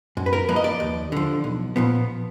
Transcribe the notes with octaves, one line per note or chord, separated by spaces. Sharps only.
F#2
B4
A#4
F3 A#3 B4
D#5
D5
D#2
D3 F3
B1
A#2 F3 B3